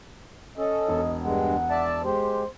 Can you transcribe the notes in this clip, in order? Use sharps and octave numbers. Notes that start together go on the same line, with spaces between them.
C#4 A4 D#5
E1
G2 G#3 F#5
D5 E5 A5
G#3 G4 C5